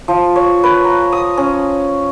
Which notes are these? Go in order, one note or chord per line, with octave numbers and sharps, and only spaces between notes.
F3
C#5
B4
A#5
D#6
C#4